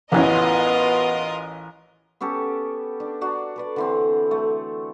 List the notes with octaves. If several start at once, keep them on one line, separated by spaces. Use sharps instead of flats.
A1 E3 B3 C#4 F4 A#4 D#5
B3 C#4 G4 A4
D4
D4 F#4 D5 A#5
A4 B4 D5
D3 E3 C4
A3